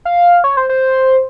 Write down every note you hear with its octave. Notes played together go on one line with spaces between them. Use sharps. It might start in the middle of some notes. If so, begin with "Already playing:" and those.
F5
C#5
C5
C5